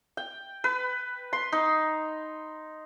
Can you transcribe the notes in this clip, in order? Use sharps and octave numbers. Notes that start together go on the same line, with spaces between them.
G5
B4
C6
D#4